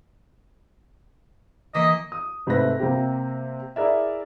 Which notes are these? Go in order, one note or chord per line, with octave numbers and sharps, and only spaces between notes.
E3 A#3 D#5 B6
D#6
G#2 C3 A3 A4 B4 A#6
C3 A#3 C4 G4
E4 G#4 A#4 D5 E5